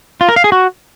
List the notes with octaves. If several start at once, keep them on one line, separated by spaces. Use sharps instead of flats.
F4
A#4
F5
G#4
F#4